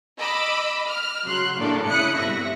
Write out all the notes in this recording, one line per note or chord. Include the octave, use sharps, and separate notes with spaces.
D#5 B5 D6 E6
F6
C#3 F#3 C6 F#6
A2 C#3 A#3 D4 A4
C#3 E4 D#6 F#6 C#7
C2 G2 B2 E5 A#6